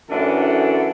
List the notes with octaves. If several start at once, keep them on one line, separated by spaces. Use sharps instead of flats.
F#2 A2 E3 D4 A4 F#5